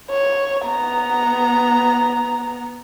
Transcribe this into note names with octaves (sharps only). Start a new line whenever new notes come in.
C#5
B3 A#5